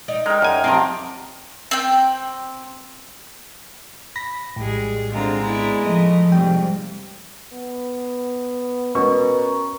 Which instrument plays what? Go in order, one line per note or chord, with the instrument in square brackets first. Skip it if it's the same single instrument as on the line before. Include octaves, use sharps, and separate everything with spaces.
[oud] D#4 D5 D#5
[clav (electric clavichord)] G#3 [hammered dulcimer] A#4 G5
[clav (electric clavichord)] F#2 G#5
[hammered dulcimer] F3 A#5 [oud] C4 G4 F5
[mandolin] C4 G5
[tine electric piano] B5 A#6 B6
[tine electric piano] A#1 A2 [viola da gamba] G3 G#3 G#4
[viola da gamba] D3 C4 F4 [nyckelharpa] G#3 A#5
[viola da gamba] B3 E4 D5
[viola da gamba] C#3 D#5 [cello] F3 A3
[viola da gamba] F2 G#2 C3 [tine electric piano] G3 G5
[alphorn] B3
[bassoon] B2 [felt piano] C#4 C#6 [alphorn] A#4